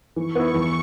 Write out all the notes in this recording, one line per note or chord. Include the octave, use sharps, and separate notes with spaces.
E3 C#6
B3 E4
E2